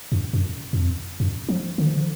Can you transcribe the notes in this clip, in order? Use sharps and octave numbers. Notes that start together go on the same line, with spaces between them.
F#2
F#2
F#2
F2
F#2
F3
D3
F3
D3